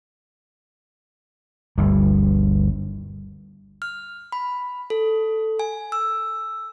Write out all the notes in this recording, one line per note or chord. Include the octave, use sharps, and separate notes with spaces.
G1 D2 G3
F6
B5
A4
G#5
E6